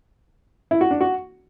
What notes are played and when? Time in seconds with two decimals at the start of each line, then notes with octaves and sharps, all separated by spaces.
0.71 E4
0.81 F#4
0.91 D4
1.01 F#4